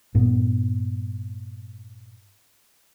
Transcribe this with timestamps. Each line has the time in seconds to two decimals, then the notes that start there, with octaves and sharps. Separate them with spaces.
0.15 G2 A#2 B3